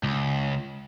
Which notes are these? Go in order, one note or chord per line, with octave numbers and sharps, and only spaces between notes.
C#2